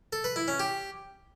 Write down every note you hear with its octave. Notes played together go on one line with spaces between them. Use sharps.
A4
B4
E4
C#4
G4